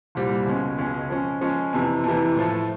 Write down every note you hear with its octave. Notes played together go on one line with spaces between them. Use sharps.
C2 A#2 G3 C4
C#2 B2 G#3 C#4
C#2 B2 G#3 C#4
F3 G#3 C#4
F3 G#3 C#4
F2 C3 E3
F2 C3 E3
A2 F3 A3